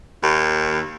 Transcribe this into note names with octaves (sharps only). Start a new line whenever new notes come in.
D#2